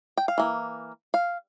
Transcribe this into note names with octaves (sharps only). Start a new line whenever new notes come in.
G5
F5
E3 A#3
F5